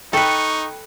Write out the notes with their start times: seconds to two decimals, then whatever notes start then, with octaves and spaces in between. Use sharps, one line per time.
0.13 D#4 A4 B4 G5 C#6